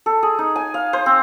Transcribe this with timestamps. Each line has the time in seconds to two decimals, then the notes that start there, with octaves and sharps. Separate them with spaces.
0.06 A4
0.23 G#4
0.39 D#4
0.56 G#5
0.74 F5
0.93 C5
1.06 C4